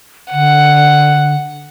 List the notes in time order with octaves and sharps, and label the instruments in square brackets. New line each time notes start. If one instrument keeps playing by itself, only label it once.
[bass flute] D3 [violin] F#5